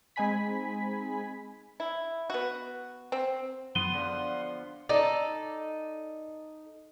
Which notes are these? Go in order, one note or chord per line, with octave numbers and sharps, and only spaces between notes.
G#3 C4 D#4 G#5 B5 B6
E4
B3 F#4
C4
F#2 B3 F#5 C6 D#7 G7
D3 F3
D#4 A4 D5